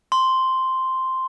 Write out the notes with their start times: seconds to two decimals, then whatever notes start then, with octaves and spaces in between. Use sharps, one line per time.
0.12 C6